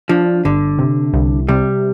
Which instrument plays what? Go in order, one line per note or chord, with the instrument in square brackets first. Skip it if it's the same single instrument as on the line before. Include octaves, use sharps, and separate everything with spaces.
[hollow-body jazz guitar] F3 [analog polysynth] D4
[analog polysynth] G1 [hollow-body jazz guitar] D3
[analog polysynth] C3
C2
[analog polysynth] C3 [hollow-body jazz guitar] G3